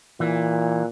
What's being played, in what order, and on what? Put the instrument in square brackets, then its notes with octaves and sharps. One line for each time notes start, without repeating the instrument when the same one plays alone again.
[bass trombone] A#2 [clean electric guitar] E3